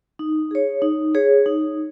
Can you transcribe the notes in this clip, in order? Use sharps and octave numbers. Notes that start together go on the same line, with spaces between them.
D#4
G#4 C#5
D#4
G#4 C#5
D#4